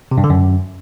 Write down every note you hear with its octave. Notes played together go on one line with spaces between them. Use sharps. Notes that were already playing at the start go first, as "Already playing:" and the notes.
C3
G2
D3
F#2